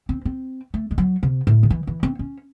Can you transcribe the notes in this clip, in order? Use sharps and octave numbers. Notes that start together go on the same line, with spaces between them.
C4
C4
A3
G#3
F#3
C3
A2
D#3
E3
E3
C4
C#4